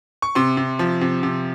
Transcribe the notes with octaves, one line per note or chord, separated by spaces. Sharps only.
C#6
C3 C6
C3
F3
C3
C3